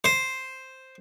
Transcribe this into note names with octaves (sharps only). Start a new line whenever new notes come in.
C5